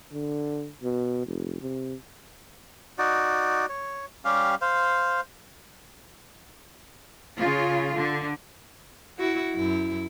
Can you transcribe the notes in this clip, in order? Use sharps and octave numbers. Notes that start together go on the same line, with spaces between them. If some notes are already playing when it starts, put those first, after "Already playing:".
D3
B2
F1
C3
D#4 F#4 D5
C#5
G3 C#4 G4 F5
C5 F5
C#3 F4
D3
E4 F#4
F#2 E4